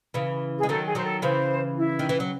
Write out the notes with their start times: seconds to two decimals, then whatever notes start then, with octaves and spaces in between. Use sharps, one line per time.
0.14 C#3 E3
0.58 G#4
0.63 G#3
0.68 D#3 F#3 A4
0.86 G#4
0.95 D#3 F#3 C5
1.05 A4
1.22 C#3 E3 C5
1.77 E4
1.99 D#3
2.09 E3
2.20 F#3